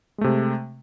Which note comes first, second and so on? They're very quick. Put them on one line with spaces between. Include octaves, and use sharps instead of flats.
G#3 A3 C3